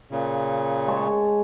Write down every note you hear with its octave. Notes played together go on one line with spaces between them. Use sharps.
A#2 C#3
G#3 C#5 A5